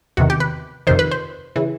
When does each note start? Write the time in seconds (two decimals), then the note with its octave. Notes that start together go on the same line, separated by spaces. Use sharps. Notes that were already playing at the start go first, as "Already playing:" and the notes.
0.17 E2 C3 D#3 F#4
0.30 G4
0.40 B4
0.87 F2 C3 D#3 C5
0.99 B4
1.11 C5
1.56 C#3 E3